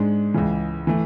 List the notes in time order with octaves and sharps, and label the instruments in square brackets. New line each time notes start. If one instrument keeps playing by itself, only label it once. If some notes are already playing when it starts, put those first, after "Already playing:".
Already playing: [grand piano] G#2 G#3 D4
C#2 C#3 E3
E3 A3